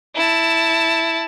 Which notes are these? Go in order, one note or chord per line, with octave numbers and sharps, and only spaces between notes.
E4 A5